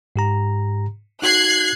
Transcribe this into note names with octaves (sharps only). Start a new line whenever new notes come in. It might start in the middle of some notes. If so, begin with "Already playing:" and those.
G#2 G4 A#5
D#4 F#4 F#6 G#6 C7